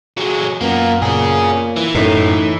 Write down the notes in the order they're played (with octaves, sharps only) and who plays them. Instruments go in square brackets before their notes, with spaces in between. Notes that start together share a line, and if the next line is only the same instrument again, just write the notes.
[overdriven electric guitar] F#3 G#3
[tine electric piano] F#2 B3 A#5 [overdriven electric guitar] A#2 A#3
[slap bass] A#2 [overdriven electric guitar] C#4 G#4
[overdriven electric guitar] E3
[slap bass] F#2 A2 [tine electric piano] A3 D#4